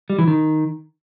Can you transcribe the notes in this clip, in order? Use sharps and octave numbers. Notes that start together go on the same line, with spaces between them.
G3
E3
D#3